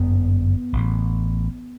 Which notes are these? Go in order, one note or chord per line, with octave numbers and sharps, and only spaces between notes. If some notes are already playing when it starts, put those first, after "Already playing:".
Already playing: G1 F#2 D3 B3
A1 A2